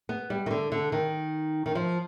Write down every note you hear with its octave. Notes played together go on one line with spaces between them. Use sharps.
B3
G3
D#3
D3
D3
D#3
D#3
F3